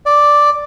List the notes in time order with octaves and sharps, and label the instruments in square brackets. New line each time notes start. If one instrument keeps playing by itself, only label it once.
[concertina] D5